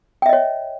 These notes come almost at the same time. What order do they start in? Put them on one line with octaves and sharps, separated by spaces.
G5 E5 D#5 C#5